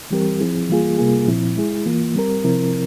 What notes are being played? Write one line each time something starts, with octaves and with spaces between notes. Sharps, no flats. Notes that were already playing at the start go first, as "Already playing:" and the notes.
E3 G3 C4 G4 A#4
F3 C4 E4 G#4
E3 G3 A#3 F4 G#4
C3 G3 A#3 F4 G#4
A#2 F3 C4 E4
G#3 E4 G#4
E3 A#3 F4
G3 C4 G4 A#4
C3 F3 C4 E4 A#4